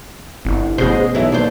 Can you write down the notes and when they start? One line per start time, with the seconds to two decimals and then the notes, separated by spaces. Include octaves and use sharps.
0.45 G1 C2
0.78 A1 B2 G#3 G#4 C5
1.15 B1 E3 E4
1.32 D#2 D4 C5